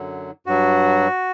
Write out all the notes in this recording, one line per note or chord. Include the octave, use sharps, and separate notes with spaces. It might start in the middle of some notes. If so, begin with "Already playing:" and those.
Already playing: F#2 D3 F#3
G2 F#3 F#4